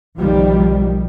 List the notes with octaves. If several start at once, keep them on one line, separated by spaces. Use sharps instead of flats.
B1 D#3 F3 G3